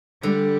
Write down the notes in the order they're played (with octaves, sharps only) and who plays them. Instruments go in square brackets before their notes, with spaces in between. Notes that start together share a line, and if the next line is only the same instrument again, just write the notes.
[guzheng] D3 [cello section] G3